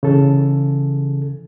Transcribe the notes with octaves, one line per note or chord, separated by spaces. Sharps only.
C#3 E3 A4